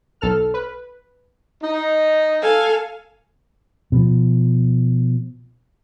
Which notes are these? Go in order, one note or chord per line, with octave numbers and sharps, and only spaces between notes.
B1 A4 F6
B4
D#4
A4 F5 G#5
B2 F3